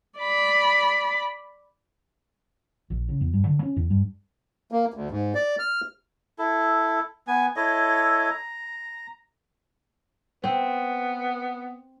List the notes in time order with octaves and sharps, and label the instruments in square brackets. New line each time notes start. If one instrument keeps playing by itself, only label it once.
[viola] D5 B5
[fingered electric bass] A#1
C#3
E2
G2
D3
C#4
E2
G2
[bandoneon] A#3
D2
G#2
D5
F6
[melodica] E4 A4
B3 G#5
E4 A4 C#5 D#5
A#5
[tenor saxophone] B3 [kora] C4